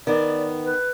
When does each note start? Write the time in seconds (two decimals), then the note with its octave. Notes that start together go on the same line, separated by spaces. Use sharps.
0.07 D#3 B3 D5
0.64 B4